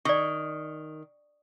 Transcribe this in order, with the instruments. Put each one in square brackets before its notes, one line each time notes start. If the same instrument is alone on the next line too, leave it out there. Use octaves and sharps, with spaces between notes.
[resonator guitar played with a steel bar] D#3 [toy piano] D5 C#6